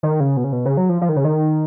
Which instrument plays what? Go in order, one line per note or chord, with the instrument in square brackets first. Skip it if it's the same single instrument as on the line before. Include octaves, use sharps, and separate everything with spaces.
[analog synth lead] D#3
C#3
B2
C#3
B2
C#3
F#3
F3
F3
D#3
C#3
D#3